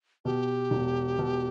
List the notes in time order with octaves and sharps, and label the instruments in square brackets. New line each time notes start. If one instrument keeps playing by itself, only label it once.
[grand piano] B2 [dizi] G4
[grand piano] E1
B2